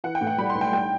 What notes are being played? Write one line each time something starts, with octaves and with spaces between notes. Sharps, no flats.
E3 F#5
G5
A2
F#5
G3 B5
C6
B1
G5
G3 G5